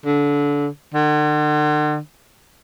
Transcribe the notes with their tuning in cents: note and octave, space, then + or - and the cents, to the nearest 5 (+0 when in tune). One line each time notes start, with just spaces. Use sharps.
D3 -25
D3 +40